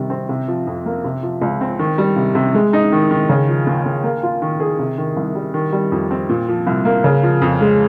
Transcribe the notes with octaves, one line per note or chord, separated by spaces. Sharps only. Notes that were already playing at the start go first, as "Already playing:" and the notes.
Already playing: C3 D#3 G3
C4
C3
F3
F2
A#3
C3
F3
C#2
C4
D#3
G3
C3
C3
G#3
D#4
D#3
D#3
C#3
F3
D#2
D#2
A#3
F4
D#3
G#4
C3
D#3
C2
G3
D#3
G3
F2
C4
A#2
F3
C2
A#3
C#3
F3
F2
G#3